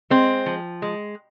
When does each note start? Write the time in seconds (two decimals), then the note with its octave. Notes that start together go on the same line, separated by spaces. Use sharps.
0.10 G#3 C4
0.46 F3
0.82 G#3